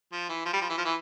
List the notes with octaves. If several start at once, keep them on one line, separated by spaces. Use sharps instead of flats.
F3
E3
F3
G3
F3
E3
F3
E3